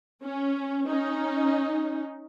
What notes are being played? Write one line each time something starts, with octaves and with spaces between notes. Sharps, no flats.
C#4
C#4 D#4